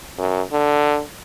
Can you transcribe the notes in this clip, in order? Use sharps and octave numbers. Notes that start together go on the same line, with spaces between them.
F#2
D3